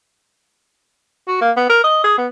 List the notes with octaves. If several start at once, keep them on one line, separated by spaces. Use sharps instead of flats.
F#4
A#3
B3
A#4
D#5
G#4
B3